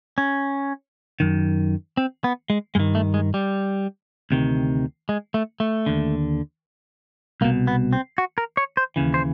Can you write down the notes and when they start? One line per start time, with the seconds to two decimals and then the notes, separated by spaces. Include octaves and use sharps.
0.18 C#4
1.20 F#2 D#3
1.97 C4
2.24 B3
2.50 G#3
2.75 G2 D#3 G#3
2.95 A3
3.14 G#3
3.34 G3
4.31 D2 C3 D#3
5.09 G#3
5.34 A3
5.60 A3
5.86 D#2 D3
7.41 C2 A#3
7.44 B2
7.67 B3
7.93 C4
8.18 F#4
8.38 A#4
8.57 C#5
8.77 C5
8.96 D#2 C#3 E3
9.14 C5